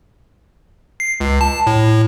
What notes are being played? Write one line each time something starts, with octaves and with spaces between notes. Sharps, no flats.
C7
C#2
A5
A2